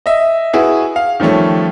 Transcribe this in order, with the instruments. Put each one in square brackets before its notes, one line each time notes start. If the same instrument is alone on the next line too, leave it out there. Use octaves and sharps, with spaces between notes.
[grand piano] D#5 E5
E4 F#4 G#4 B4
F5
D#3 F3 G3 A3 C#4